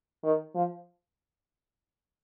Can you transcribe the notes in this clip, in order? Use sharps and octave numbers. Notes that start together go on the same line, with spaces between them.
D#3
F3